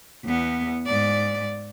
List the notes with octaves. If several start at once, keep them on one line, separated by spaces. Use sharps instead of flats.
E2 B3
G#2 D5